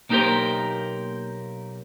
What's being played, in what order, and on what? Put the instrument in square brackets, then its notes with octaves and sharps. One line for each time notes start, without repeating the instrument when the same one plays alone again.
[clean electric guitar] B1 A#3 D#4 G4 A#4 C5